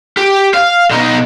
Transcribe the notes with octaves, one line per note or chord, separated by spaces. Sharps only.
G4
F5
B2 D#4